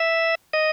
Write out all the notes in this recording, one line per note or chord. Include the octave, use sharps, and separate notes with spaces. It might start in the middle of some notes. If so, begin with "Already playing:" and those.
Already playing: E5
D#5